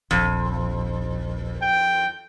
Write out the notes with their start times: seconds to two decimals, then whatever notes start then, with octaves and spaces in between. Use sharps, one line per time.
0.11 D#1 A#1 F2
1.62 G5